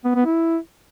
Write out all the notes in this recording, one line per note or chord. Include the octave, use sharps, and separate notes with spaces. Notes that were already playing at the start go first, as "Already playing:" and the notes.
B3
B3
E4